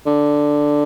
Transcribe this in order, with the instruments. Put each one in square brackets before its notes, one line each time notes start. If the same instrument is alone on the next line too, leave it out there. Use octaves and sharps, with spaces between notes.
[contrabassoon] D3